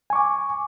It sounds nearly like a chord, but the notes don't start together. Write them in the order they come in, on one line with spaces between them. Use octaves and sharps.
G#5 C#6 D6